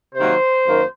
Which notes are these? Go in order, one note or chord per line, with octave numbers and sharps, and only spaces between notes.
C3 D#3 F#3 A#3 C5
F#2 D#3 A#3